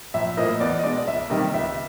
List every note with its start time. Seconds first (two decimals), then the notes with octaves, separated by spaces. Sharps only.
0.14 A#1 E5
0.37 A2 F3 A#3 D#5
0.60 E2 D5
0.79 D#5
0.84 B2 G#3 D5
1.07 C#2 E5
1.30 C3 D#3 G3 A#3 D#5
1.54 C#2 E5